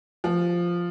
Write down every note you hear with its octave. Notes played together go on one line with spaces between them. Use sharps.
F3